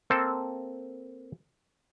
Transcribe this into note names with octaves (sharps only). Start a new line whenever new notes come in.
A#3 C4 A4 C5